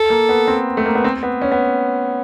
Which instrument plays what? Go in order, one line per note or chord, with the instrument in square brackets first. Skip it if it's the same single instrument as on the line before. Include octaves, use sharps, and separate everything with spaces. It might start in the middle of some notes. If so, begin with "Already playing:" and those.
Already playing: [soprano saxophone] A4
[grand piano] A#3
B3
C4
A3
A#3
B3
C4
B3
C#4
B3